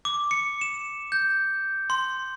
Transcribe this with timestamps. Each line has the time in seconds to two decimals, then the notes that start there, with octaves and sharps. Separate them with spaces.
0.05 D6
0.31 C#7
0.61 E7
1.12 G6
1.90 C6